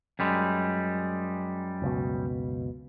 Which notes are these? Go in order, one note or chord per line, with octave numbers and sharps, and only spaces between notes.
F#2 G3 G#3
F#1 C#2 B2